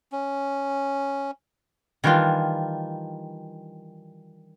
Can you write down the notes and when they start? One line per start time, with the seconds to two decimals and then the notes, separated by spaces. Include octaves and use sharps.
0.12 C#4
2.04 D#3 E3 G3 D4 F4